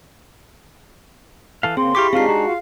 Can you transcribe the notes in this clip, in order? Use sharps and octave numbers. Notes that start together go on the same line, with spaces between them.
E3 A4 F5
C#3 A#3 C4 G#4 C6
E4 G4 F5 G5 C#6 D6 B6
G#3 C4 D4 D#4 F4 G#4 F5 C7
F#4 A#5
F4 F5